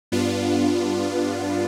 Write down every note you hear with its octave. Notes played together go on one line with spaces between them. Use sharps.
G2 B3 D4 F4